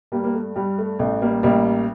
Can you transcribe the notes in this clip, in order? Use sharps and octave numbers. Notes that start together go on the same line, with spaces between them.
G2 G3 A#3
A#3
A3
G2 G3
A3
A1 A3
G3 A#3
A1 G3 A#3